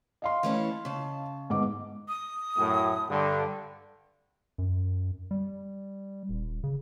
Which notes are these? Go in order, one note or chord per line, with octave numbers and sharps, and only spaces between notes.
D#5 F5 C6
E3 A3 C#4
C#3 A5
G#2 B3 D6
D#6
F#2 A2
G2 D3
F#2
G3
D#1
C#3